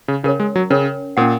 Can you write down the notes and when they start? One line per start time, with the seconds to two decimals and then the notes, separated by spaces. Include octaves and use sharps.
0.08 C#3
0.23 C#3 C#4 A#4 C#5
0.40 G#3
0.56 F#3
0.70 C#3 C#4 A#4 C#5
1.17 A#2 C#4 A#4 F#5